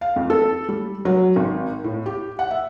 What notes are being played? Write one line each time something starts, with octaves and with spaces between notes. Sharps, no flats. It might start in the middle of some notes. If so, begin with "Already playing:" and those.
F5
F2
A4
G3
F#3
G#1
A2
G4
F#5
E5